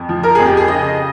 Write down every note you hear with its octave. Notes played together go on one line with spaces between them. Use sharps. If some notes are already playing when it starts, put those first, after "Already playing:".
Already playing: F2
F3
A#4
F2 G#4
G4
G#4
C#3 D#5